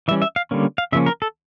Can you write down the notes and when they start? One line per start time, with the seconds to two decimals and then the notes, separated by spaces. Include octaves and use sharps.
0.08 E3 G3 C#4 E5
0.22 E5
0.36 F5
0.51 D3 G3 A#3 C#4
0.78 F5
0.92 C#3 F3 A#3 C#4 E5
1.06 A#4
1.22 A4